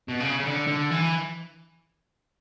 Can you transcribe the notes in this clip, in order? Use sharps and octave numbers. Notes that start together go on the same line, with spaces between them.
B2
C#3
C#3
D3
D3
E3